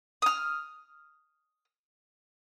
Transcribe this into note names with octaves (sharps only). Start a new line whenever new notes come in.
D#6 F6